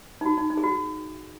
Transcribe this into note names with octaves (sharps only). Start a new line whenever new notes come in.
D#4
F#4
D#4
D#4
G#4
F#4